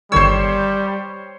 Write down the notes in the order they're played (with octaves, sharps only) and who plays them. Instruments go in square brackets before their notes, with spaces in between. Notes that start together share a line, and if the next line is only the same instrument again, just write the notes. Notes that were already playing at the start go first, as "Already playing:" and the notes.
[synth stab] G1 D#3 E6 [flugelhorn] G3 [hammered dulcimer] C5 C#5